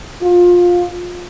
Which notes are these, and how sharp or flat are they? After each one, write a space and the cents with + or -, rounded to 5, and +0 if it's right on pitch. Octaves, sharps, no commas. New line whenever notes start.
F4 +20